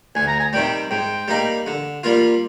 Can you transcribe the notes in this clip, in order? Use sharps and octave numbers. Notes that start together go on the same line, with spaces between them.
D2 G#5
A#5
G#5
C3 D#3 G3 G5
G#2 G5
G3 A#3 D#4
D3
G3 A#3 F4